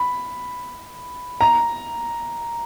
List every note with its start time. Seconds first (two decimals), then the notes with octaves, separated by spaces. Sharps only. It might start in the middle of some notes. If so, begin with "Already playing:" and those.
Already playing: B5
1.41 A#5